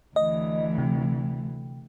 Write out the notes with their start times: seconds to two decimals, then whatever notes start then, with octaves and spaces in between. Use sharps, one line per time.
0.16 D2 E3 D#5
0.78 C3